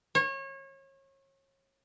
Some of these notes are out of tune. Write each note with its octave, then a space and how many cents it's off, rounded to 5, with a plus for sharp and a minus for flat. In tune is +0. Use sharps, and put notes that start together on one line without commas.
C#5 -30